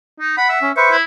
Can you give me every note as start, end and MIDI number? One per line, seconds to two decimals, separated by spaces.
0.20 0.36 63
0.38 0.59 78
0.38 0.47 83
0.50 0.69 76
0.62 0.72 61
0.77 0.97 71
0.77 0.97 72
0.77 0.97 76
0.77 0.90 85
0.92 1.02 64